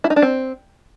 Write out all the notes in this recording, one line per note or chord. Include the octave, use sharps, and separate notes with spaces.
E4
D#4
D4
C4